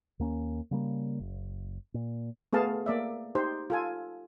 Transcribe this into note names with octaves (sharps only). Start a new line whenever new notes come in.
D#2 A#3 C#4
C#3 G3 A#3
F#1
A#2
A3 B3 G#4 F5 A5
A#3 D5 E5
D#4 G4 C5
F4 A4 G#5